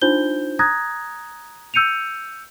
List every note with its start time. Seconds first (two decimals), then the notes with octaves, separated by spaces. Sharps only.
0.01 D4 D#4 F4 C5 G6 G7
0.59 A#5 D#6 F#6 G#6 A#6
1.74 E6 G6 C#7 D#7 F7